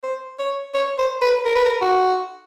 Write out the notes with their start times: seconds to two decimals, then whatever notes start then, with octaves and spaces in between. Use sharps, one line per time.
0.03 C5
0.39 C#5
0.74 C#5
0.98 C5
1.22 B4
1.46 A#4
1.55 B4
1.65 A#4
1.82 F#4